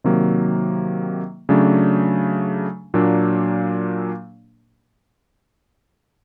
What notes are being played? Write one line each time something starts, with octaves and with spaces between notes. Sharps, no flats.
C3 D#3 F#3 A#3
C#3 F#3 A3 D4
A#2 F#3 A#3 D4